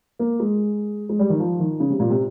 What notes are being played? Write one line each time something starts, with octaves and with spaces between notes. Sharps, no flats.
A#3
G#3
G#3
G3
D#3
F3
D#3
C#3
C3
A#2
C3